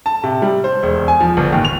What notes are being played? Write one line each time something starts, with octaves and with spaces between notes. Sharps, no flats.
A5
C3
G3
C5
E1
G#5
F3
G1
D#2
F7